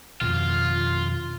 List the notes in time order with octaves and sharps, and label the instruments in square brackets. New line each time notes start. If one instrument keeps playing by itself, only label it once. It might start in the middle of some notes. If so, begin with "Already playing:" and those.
[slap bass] F2 B2 D#3 [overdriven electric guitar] F4